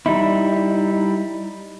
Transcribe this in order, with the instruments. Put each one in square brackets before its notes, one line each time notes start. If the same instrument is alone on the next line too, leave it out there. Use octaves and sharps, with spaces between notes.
[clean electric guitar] G3 D#4 E4